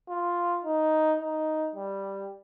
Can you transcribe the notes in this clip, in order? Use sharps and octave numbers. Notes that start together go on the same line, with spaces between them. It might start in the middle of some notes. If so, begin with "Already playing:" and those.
F4
D#4
D#4
G3